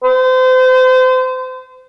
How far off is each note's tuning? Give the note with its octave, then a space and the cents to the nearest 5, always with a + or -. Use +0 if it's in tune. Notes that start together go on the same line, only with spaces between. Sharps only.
C5 -35